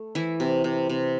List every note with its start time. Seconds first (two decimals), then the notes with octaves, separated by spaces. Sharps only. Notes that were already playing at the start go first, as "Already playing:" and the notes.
Already playing: A3
0.15 E3 E4
0.40 C3
0.64 C3
0.89 C3